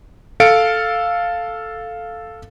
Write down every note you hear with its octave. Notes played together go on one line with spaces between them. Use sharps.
A4 F5 C#7 D7